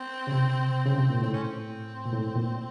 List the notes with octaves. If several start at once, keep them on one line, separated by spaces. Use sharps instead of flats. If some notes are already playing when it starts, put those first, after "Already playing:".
Already playing: C4
C#3
C3
C#3
C3
A#2
A2 C4
C#4
C4
A#2
A2
A#2